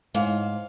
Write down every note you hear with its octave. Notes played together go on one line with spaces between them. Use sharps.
G#2 F5